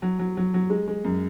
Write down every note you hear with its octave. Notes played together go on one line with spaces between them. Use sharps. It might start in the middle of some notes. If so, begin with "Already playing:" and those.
F#3
F#3
F#3
F#3
G#3
G#3
F#2